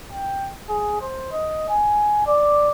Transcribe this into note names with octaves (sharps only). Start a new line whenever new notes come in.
G5
G#4
C5
D#5
G#5
D5